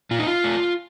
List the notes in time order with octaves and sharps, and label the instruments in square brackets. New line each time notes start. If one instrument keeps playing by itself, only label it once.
[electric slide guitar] A#2 F4
D#4
F4
A3